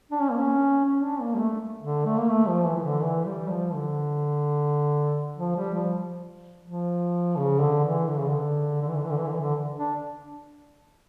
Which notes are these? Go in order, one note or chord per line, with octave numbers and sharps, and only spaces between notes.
D4
C#4
A#3
C#4
C#4
D4
A#3
G3
A3
D3
A3
A#3
A3
F3
E3
E3
D3
E3
G3
F3
D3
F3
G3
F3
F3
C#3
D3
E3
D3
C#3
D3
D3
E3
D3
E3
D3
E3
D3
E3
D3
D4